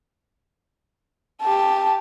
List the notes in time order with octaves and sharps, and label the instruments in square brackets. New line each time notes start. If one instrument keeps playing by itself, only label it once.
[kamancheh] G4 A5